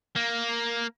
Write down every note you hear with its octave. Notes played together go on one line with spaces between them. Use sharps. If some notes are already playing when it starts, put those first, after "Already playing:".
A#3